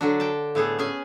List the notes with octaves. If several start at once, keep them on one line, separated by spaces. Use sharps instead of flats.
D3 F#3 D4
G5 A5
A2 B3 G#4 A4
C#4 G#4 G#5